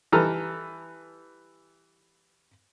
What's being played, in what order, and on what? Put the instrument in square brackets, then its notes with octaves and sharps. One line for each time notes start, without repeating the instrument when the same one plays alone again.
[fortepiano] E3 G3 A4 A#5 F6